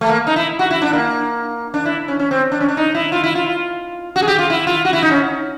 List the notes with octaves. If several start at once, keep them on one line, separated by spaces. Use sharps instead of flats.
A3
A#3
D#4
E4
F#4
E4
D4
A#3
D4
E4
C#4
C#4
C4
D4
C#4
D4
D#4
E4
F4
E4
F4
F#4
G#4
G4
F4
E4
F4
F#4
E4
D#4
C#4